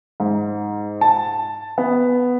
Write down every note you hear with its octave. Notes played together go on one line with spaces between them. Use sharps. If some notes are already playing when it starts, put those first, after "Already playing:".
G#2
A5
B3